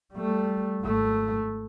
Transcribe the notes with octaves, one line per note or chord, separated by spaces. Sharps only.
G3 A3
G#1 A3